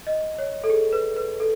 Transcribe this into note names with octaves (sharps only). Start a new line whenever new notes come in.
D#5
C#5
A4
G#4
B4
B4
A4